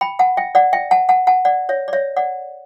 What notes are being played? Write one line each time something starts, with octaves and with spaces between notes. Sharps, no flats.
G5 B5
F#5 A5
E5 G5
D5 F#5
E5 G5
F#5 A5
F#5 A5
F#5 A5
D5 F#5
C#5 E5
D5
C#5 E5
D5 F#5